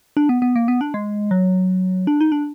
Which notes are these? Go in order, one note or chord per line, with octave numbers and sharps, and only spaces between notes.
D4
B3
B3
A#3
B3
D4
G#3
F#3
D4
D#4
D4